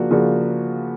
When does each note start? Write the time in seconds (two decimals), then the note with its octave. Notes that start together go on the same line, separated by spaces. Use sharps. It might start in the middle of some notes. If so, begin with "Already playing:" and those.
Already playing: C#3 F3 A#3 D4 F#4
0.10 C#3 F3 A#3 D4 F#4